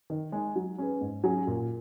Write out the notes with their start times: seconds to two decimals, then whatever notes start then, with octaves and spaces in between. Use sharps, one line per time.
0.10 D#3
0.32 G#3 D#4
0.56 F#3
0.78 C#4 G#4 B4
1.01 G#2
1.24 F#3 C#4 G#4
1.47 A#2